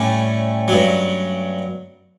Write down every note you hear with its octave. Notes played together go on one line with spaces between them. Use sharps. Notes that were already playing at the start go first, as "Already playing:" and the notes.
Already playing: A2 G3 A3 C#4
G2 F#3